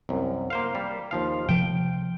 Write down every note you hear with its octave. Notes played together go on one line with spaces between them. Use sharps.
C2 F#2
A#3 C5 F5
G3
D#2 F3 F5
C3 F3 G5